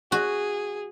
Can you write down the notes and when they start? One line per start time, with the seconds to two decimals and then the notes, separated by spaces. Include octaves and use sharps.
0.12 F#4 G#4